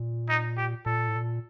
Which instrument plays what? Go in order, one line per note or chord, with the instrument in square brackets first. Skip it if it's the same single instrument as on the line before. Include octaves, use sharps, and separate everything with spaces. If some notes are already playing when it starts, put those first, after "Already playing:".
Already playing: [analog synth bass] A#2
[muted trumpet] D#4
G4
[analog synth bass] A#2 [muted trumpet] A4
[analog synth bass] A2
A#2